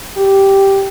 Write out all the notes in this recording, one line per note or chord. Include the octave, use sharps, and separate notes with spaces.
G4